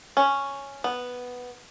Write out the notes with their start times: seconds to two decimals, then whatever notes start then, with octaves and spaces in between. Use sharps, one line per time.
0.17 C#4
0.84 B3